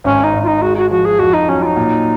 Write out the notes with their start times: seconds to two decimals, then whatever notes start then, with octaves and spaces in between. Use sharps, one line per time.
0.04 G#1 C#4
0.24 D#4
0.33 G#1
0.43 F4
0.47 D#4
0.62 G#3 F#4
0.77 F#4
0.91 F3 F#4
1.05 G#4
1.19 F2 F#4
1.34 D#4
1.49 F#3 C#4
1.62 F4
1.66 D#4
1.76 A#2